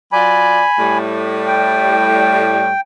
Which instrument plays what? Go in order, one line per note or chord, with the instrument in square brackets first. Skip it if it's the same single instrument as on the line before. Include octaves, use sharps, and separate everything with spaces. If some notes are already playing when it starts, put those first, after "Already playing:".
[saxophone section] F#3 F4 D5 [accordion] G#5 B5
[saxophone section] A2 G3
[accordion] G5